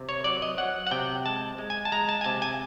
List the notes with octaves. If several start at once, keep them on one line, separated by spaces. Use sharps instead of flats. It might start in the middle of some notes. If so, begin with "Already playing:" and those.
Already playing: C3
C#5
F#3 D5
D#5
F#3 F#5
F#5
C3 G5
G#3 A5
G#3
G#5
A5
G#3 A#5
A5
G#5
C3 A5
G#5